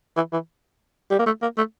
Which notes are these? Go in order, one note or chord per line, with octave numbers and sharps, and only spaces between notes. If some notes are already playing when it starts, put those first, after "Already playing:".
E3
E3
G3
A#3
A3
A#3
A3